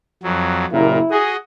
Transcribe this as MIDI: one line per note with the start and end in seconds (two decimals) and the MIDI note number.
0.23 0.65 41
0.23 0.65 54
0.72 0.98 30
0.72 0.98 46
0.72 1.18 64
0.72 0.98 67
0.72 0.98 70
1.11 1.36 66
1.11 1.32 68
1.11 1.36 75